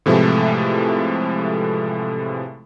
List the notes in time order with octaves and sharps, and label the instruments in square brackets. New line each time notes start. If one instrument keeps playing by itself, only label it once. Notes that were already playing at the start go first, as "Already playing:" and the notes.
[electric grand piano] A2 C3 E3 F3 G#3 A3